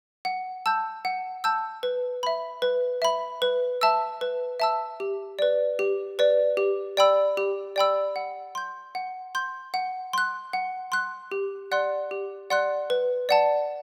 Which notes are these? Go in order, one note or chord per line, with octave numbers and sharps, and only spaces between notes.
F#5
A5 E6 G6
F#5
A5 E6 G6
B4
E5 B5
B4
E5 B5
B4
E5 A5 E6
B4
E5 A5 E6
G4
B4 D5
G4
B4 D5
G4
D5 G5 B5 E6
G4
D5 G5 B5 E6
F#5
C6 G6
F#5
C6 G6
F#5
C6 F#6
F#5
C6 F#6
G4
D5 F#5 C6 F#6
G4
D5 F#5 C6 F#6
B4
D5 F#5 A5